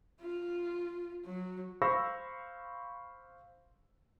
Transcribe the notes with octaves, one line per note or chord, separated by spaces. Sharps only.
F4
F#3
C5 F5 B5 C#6 E6 A#6